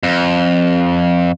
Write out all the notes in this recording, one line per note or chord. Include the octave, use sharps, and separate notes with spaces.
F2